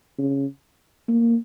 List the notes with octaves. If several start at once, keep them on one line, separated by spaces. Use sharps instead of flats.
C#3
A#3